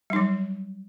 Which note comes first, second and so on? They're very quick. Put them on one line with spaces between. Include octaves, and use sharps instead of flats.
G3 D#4 F#3